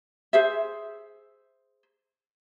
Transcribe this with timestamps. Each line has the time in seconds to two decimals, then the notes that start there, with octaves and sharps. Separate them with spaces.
0.33 G#4 C5 E5